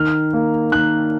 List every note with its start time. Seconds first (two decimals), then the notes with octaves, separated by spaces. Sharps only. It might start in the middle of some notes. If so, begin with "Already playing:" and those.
Already playing: D#3 F6
0.33 A#3
0.72 D#3 F#6